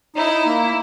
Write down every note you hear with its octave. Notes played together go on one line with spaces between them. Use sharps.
D#4 E4
A#3